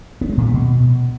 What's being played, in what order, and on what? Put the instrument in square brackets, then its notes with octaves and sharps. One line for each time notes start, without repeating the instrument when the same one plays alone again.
[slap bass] B3
G#3
A#2
B3
B2